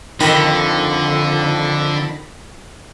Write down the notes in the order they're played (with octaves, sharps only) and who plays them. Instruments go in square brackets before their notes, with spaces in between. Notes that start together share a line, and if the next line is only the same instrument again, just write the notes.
[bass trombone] F2 [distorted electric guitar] D3 [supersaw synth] D#3 B5 A#6 [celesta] A#4 G5